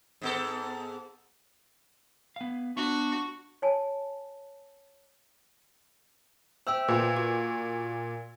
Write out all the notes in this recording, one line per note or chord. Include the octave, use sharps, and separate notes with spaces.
G#2 B3 A4
B3 F5
B3 D4 F#4 C#6
C#5 G#5 A5
C5 E5 G5 E6
A#2 B4
F#4